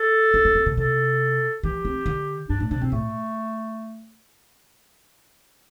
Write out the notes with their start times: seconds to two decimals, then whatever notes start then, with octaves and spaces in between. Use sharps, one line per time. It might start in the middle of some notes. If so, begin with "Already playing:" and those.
Already playing: A4
0.34 D4
0.45 D4
0.55 C4
0.66 C3
0.77 C3 A4
1.63 E3 G4
1.85 C4
2.06 D3
2.49 G2 D4
2.60 A2 D4
2.71 C3 D4
2.81 C3 C4
2.92 A2 A3